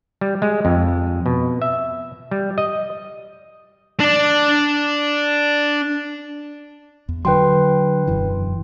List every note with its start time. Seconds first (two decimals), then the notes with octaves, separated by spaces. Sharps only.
0.21 G3
0.42 G#3
0.65 F2
1.26 B2
1.62 E5
2.31 G3
2.58 D#5
4.00 D4 D5
7.09 E2
7.25 D3 F#3 B4 G5 C6
8.07 E1 F#2 E3